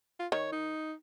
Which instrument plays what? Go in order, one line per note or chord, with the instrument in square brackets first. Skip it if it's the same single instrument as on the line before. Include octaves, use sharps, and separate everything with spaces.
[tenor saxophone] F4
[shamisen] D#3 [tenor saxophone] C#5
[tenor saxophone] D#4